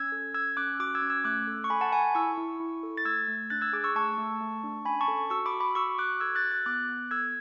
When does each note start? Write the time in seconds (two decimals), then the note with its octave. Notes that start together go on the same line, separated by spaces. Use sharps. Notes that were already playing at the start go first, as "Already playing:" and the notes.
Already playing: C#4 E6 G#6
0.12 A4
0.34 C#4 E6 G#6
0.57 C#4 D6 F#6
0.80 F#4 D6 F#6
0.95 E6 G#6
1.02 C#4
1.10 E6 G#6
1.24 A3 D6 F#6
1.47 A4
1.64 C#6
1.70 A4 G#5 B5
1.81 F#5 A5
1.92 A4 G#5 B5
2.15 E4 C#6 E6
2.38 E4
2.60 E4
2.83 A4
2.97 A6
3.05 A3 E6 G#6
3.28 A3
3.50 D4 F#6 A6
3.61 E6 G#6
3.73 G#4 D6 F#6
3.84 C#6 E6
3.95 A3 A5 C#6
4.18 A3
4.41 A3
4.64 D4
4.85 C#4 G#5 B5
5.01 A5 C#6
5.08 A4
5.30 F#4 C#6 E6
5.46 B5 D6
5.53 F#4
5.60 B5 D6
5.75 F#4 C#6 E6
5.98 F#4 D6 F#6
6.20 A4 E6 G#6
6.35 F#6 A6
6.44 F#4
6.51 F#6 A6
6.66 B3 D6 F#6
6.89 B3
7.11 A4 E6 G#6